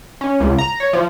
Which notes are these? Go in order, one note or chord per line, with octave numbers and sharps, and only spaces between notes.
C#4
C#2
A#5
C#5
F3